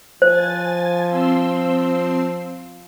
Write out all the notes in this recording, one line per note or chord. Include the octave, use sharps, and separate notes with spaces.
F3 C5 G#5 A6
C4 C6 E6